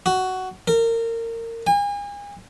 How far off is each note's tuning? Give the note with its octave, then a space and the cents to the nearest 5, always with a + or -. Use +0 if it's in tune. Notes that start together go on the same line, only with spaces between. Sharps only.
F#4 +10
A#4 -25
G#5 -40